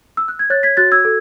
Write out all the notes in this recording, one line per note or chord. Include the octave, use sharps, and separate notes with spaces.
E6
F#6
G#6
C#5 F#6 A6
G#6 B6
F#4 F#6 A6
E6 G#6
A4